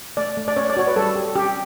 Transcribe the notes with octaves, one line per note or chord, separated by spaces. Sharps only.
A3 D5
A3
D5
C#4 C#5
D5
F#4 C#5
B4
G3 A4
G4
C#4 G4